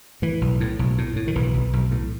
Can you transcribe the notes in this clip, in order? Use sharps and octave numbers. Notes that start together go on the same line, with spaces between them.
A2 E3
B1
A2
B1
A2
A2
D#3
B1 E3
B1
B1
A2